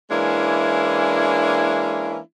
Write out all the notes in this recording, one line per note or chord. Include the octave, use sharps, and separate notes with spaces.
E3 G#3 A#3 C#4 D4 E4